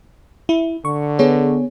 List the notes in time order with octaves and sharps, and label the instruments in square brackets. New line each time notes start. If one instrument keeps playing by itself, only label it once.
[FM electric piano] E4
[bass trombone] D3 [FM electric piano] C#6
[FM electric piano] B3 G#4 C#5